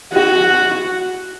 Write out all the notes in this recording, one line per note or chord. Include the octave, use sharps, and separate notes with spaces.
F#4